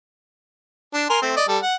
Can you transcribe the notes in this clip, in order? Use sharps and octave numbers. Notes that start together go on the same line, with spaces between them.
D4
A#4 G#5 C6
A3 C4
D5 D#5
G3 A4
F#5